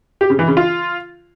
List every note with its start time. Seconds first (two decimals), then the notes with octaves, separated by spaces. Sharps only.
0.21 G4
0.30 C#3
0.39 E3
0.48 C#3
0.57 F4